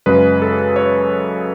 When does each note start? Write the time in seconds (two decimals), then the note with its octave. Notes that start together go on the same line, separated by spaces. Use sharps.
0.06 F#2 C#3 G#3 B4
0.42 A4
0.76 C#5